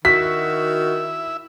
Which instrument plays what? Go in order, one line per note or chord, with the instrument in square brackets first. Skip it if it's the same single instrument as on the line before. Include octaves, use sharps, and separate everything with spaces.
[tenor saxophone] D#3 [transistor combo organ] E4 E5 [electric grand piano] F#4 [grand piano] B6